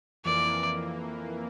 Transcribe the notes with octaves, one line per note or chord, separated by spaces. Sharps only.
F2 E3 A#3 D5